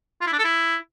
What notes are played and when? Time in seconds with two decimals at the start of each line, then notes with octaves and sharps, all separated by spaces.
0.21 F4
0.27 E4
0.33 D4
0.39 A4
0.44 E4